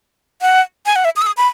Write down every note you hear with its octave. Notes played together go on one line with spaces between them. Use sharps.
F#5
G#5
F#5
E5
D#6
E6
D#6
B5